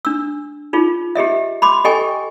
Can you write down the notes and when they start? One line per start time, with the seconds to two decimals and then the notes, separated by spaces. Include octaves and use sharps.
0.05 D4 E6
0.73 D#4 F4 G#4
1.15 G4 G#4 D#5 E5
1.62 B5 C6 D6
1.84 G4 A4 D#5 G5 G#5 C#6